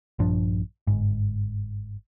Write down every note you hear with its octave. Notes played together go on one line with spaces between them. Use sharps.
A#1 G2 F3 D4
G1 G#2